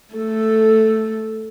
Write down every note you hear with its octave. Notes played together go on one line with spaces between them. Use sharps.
A3 A4